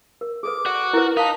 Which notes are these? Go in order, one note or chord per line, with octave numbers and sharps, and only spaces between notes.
A#4
G#4 A4 B4 D6
F#4 D5
E4 A#4 B4
D#4 F5 A5 B6